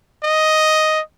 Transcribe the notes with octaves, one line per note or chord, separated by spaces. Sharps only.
D#5